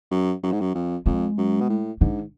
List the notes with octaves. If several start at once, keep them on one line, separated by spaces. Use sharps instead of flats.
F#2
F#2
G#2
F#2
F2
F2 G#3
F#2
B2
A2
G#2 D3